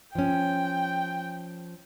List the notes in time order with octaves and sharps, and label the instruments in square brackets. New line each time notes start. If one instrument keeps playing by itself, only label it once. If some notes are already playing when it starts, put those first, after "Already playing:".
[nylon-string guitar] F3 C#4 [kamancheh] G5